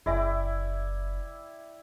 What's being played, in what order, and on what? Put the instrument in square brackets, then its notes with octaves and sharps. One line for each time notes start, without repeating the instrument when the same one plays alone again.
[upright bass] F#1 [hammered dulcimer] E4 D5 G5 [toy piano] G#4 E5 G#5